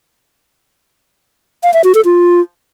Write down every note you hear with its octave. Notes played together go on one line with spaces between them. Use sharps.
F5
E5
F#4
A4
F4